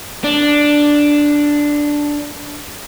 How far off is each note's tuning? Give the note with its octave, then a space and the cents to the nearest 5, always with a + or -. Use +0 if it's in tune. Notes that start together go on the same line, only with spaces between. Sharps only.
D4 +0